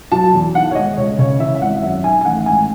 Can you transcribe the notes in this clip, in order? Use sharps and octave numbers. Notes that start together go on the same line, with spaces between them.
F#3 A5
E2
D#3 F#5
C#5
G#3 D#5
C#2 C#5
C#3 C#5
E3 E5
E5
G#1 F#5
F#2 E5
D#3 G#5
G#5
A1 F#5
G#2 G#5